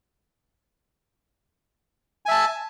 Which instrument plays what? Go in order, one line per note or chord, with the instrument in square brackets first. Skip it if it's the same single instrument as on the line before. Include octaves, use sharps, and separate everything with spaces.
[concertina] G#5
E5
A5